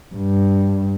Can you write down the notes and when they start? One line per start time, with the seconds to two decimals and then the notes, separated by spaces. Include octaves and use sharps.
0.15 G2